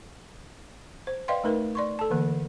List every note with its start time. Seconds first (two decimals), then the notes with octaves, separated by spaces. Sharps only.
1.07 C5
1.28 B4 D5 D#5 F5 G5 C6
1.44 A3 D#4 A#4 B4
1.75 D5 C6 C#6
1.99 A4 A5
2.10 D3 E3 A#3